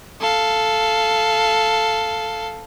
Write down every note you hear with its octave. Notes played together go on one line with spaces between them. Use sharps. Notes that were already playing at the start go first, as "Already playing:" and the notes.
A4 F5